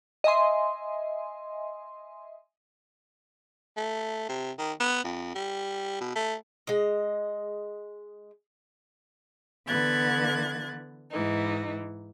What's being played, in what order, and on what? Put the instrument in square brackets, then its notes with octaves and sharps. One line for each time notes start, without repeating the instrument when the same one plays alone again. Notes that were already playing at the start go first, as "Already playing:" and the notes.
[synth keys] D#5 E5 G#5 C6
[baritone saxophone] A3
C3
D#3
B3
F2
G3
B2
A3
[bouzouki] G#3 D#5
[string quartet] D3 E3 B3 F#6 G#6 A6
G#2 E3 D#4